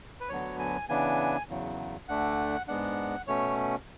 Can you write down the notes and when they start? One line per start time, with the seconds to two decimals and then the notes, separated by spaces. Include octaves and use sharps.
0.21 B4
0.29 D2 D3 F#3 B3 C#5
0.59 G#5
0.89 C#3 E3 B3 D4 G#5
1.49 E2 C#3 F#3
2.08 D2 D3 A3 D4 F#5
2.68 G#2 G#3 B3 D4 F#5
3.28 B2 A3 C#4 C#5